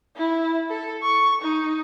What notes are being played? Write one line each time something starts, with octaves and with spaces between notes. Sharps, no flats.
E4
A4
C#6
D#4